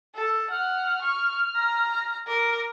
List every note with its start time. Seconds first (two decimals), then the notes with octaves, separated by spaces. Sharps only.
0.15 A4
0.50 F#5 F6
1.01 C#6
1.56 A#5
2.27 A#4 D6